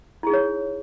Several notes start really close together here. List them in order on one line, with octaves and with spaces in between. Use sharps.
E4 G#4 D#4 C#5